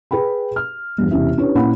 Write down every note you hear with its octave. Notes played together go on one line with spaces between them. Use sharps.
G#4 B4 G5 B5
F6
E2 G2
E1 C3 C#4 E4 E5
C#4 D4 E4 G4 B4 C#5
A#2 A#3 C#4 E4 F#5 B5